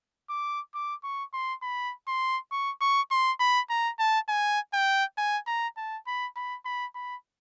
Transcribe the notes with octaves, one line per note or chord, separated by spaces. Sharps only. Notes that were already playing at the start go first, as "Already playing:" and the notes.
D6
D6
C#6
C6
B5
C6
C#6
C#6
C6
B5
A#5
A5
G#5
G5
G#5
A#5
A5
B5
B5
B5
B5